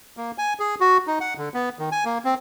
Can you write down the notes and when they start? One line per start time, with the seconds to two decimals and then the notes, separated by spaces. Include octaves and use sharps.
0.17 A#3
0.38 G#5
0.60 G#4
0.80 F#4
1.07 D#4
1.21 F#5
1.38 D3
1.54 B3
1.79 D#3
1.92 G#5
2.05 A#3
2.24 C4